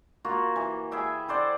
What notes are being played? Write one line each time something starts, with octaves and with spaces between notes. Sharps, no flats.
A#3 F4 F#4
E3
G#4 B4 E5 G5
A4 C5 D5 F#5